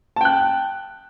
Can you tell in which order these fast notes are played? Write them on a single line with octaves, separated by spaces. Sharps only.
A5 G5 F#6